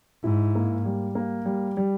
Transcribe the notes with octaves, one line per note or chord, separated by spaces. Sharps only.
G#2 E4
A#3
G3
A#3
G3
G3